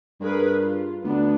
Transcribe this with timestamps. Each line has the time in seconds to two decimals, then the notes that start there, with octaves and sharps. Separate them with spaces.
0.20 G2 G#4 A#4 B4
0.59 F4
1.04 D2 B3 D4